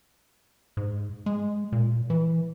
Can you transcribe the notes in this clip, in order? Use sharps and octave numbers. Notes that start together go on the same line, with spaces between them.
G#2
G#3
A#2
E3